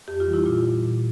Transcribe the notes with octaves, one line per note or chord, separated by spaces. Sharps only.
F2 G4
F4
E3 G3
E4
A#2 F4
G3
A#2